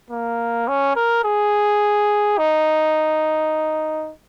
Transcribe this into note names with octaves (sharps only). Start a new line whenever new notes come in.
A#3
C#4
A#4
G#4
D#4